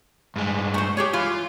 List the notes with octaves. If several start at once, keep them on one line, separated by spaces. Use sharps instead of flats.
G2 G#3
A3 C5
G4 G#4 C#5
E3 F4